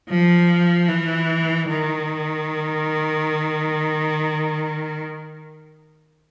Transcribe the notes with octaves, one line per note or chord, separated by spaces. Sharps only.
F3
E3
D#3